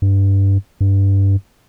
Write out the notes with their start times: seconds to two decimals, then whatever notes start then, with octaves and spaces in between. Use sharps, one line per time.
0.02 G2
0.81 G2